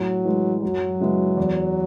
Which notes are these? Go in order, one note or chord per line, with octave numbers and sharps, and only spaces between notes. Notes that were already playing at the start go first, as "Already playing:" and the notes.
Already playing: A2 F#3
E3 G#3
F#2 F#3
C#3 G#3 B3 E4
E2